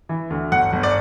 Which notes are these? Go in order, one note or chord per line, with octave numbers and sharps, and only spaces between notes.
E3
D2
G1 F#5
G1
D5